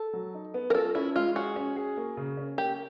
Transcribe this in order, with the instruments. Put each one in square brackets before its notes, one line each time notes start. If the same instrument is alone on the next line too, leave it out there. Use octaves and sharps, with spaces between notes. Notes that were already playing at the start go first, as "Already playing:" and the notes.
Already playing: [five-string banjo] A4
[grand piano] F#3
D#4
B3
[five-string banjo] A#4
[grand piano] F4 [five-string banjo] A4
[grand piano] C#4 [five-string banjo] E4
[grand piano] G#3 [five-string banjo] F4
[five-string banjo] F#4 [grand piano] G#4
[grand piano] C#4
G#4
A#3
C#3
C#4
[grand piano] A#3 [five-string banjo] G4